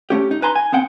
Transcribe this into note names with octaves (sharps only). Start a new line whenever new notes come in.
A3 C#4 G4
D#4
B4 G#5 A#5 C6
G#5
B3 C4 F#5 G5